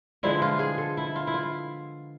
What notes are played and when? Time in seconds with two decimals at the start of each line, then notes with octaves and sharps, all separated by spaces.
0.23 D3 F3 G#3 B3 E4
0.42 F4
0.59 G#4
0.78 A4
0.97 E4
1.16 F4
1.27 E4
1.34 F4